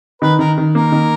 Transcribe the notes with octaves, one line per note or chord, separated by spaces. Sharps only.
D#3 B4
D#3 A#4
D#3
A#3 A#4
D#3